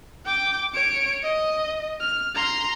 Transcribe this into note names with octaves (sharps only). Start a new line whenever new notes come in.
G5 D6
C#5 D7
D#5
F6
A#5 C6